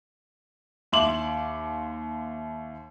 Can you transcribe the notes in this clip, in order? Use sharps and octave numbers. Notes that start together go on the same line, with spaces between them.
D#2 E5 C6 D6 F#7